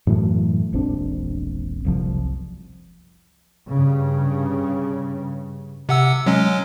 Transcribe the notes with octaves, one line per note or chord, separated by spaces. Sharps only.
F#2 A2 E3 A3
E1 A#1 C4 D4
F#1 C2 F3
G2 C#3
C3 F#5 E6
F#3 G#3 C#4